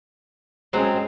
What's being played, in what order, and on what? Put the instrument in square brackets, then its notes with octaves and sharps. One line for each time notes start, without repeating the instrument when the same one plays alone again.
[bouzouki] F#3 C4 [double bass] G#3 C#4